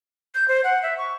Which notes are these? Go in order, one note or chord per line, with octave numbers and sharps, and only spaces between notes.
G6
C5
F#5
E5
C#6